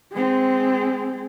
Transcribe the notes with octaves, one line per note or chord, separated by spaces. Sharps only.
G#3 C4